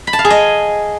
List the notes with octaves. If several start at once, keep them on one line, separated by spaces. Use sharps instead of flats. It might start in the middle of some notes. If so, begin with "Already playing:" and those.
B5
A5
F5
G#4
D#5